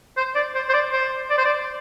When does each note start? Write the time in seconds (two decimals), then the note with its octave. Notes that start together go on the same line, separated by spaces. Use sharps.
0.17 C5
0.35 D5
0.55 C5
0.69 C5
0.74 D5
0.92 C5
1.30 D5
1.38 C5
1.45 D5